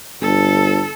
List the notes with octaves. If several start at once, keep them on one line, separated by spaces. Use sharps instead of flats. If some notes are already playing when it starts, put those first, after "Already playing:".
G1 A4